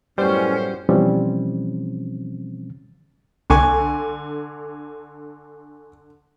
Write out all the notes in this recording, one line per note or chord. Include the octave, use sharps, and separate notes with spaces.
F#2 A2 G3 B3 C#4 C5
B2 E3 F3 G3 C4 C#4
C2 D3 G#5 C#6 D6